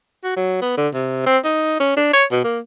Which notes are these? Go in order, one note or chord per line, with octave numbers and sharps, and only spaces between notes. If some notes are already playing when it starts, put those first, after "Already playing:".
F#4
F#3
B3
D3
C3
C4
D#4
C#4
D4
C#5
B2
A#3